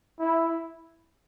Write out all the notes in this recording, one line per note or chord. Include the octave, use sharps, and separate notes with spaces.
E4